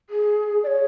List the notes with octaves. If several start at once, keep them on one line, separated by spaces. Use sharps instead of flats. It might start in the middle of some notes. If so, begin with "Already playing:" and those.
G#4
D5
C#5